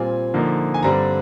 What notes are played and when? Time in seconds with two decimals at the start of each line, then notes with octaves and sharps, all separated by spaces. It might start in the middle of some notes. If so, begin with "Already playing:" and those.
Already playing: A#2 G3 C4 F4 G#5
0.34 D3 F3 A#3 D#4
0.74 G#5
0.83 G2 D3 G3 C4 A#5